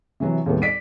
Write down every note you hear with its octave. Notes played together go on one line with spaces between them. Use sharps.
C3 E3 F#3 F#4
D#2 A2 C3 G3 B3
D5 B6 C7 D7